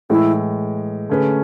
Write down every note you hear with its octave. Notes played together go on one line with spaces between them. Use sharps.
A2 E3 G#3 E4
D3 A3 C#4 G#4 B4